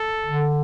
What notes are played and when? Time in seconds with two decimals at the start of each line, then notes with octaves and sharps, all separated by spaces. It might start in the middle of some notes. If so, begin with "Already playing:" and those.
Already playing: A4
0.26 D3